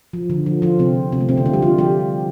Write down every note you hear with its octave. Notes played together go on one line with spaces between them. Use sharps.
F3
D3
F3
F3 F4
C3 C4
C3 C4
A3
C3 C4
D3 D4
F3 F4
G3 G4
F3 F4
G3 G4